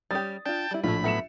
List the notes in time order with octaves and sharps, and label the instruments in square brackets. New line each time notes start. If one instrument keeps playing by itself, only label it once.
[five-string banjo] G3 C#4 G4 [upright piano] D#6 A6
[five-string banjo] D4 F4 [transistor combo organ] G5 A5
[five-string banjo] G3 E4
[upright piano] A#1 [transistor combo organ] A2 B5 [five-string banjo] A3 E4 F4
[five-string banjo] F#3 A3 B3 [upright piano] E5 C#7 E7